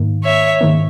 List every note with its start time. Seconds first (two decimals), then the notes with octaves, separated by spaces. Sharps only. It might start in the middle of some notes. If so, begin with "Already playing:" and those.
Already playing: G#2 D#3 A#3
0.24 C#5 E5
0.61 G#2 D#3 A#3